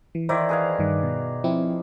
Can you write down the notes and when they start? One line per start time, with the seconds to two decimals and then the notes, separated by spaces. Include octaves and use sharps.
0.15 E3
0.29 D#3 E3 E4 C5 D5
0.49 G#4 B4 F5
0.79 G2 D#3
1.03 B2
1.44 F3 C4 E4